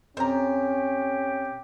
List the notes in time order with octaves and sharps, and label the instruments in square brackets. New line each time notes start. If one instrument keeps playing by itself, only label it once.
[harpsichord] F2 [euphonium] C#4 [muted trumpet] G4 [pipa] C5 A#5